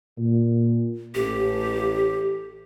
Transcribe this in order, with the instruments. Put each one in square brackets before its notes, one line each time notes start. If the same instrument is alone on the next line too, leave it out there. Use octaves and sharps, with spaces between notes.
[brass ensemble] A#2
[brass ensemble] A1 [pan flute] G4